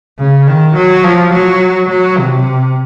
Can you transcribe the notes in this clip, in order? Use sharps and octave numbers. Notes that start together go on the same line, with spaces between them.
C#3
D#3
F#3
F3
F#3
F#3
C3